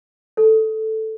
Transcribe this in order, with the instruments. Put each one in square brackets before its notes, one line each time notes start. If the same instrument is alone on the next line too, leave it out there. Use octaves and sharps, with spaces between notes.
[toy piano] A4